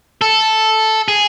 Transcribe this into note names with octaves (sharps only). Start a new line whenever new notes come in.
A4
G#4